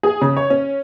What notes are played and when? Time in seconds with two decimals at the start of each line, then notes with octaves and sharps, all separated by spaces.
0.03 G#4
0.22 C#3
0.37 C#5
0.50 C#4